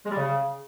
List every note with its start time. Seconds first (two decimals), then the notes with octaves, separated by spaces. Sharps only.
0.05 G#3
0.11 G3
0.17 C#3